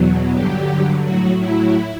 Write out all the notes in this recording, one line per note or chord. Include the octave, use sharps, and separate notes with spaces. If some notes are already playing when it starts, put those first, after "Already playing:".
Already playing: E2 B2 F#3
G2 D3 F#3 G4
A2 F#3 F#4
E4